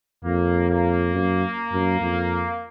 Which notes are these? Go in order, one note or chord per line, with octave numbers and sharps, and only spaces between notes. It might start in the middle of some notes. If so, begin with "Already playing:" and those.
F2 A#3
A#3
F#2
F#2
F2